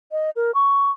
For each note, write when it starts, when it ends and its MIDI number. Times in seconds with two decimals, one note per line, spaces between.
0.12 0.30 75
0.36 0.51 70
0.54 0.91 85